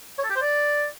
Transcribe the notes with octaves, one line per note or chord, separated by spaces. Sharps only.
C#5
A4
G4
C5
D5